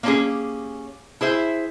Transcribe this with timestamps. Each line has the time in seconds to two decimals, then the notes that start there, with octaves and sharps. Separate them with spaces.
0.03 A#3 C4 C#4 D#4 G4 G#4
1.21 E4 G#4 C5 E5